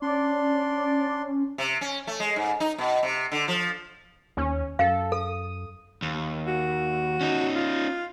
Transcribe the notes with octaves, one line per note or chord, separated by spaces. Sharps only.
C#4 D4 D5 C6
C3
C#4
A3
G#3
G#2
D#4
B2
C3
D3
F3
D#2 C#4
F#2 A4 F5
A4 D#6
D#2
F#4
C#4 D#4
F4